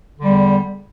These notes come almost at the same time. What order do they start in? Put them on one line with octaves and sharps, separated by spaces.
D3 E2 G3